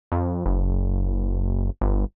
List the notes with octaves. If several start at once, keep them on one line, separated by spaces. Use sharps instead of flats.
F2
F#1
G1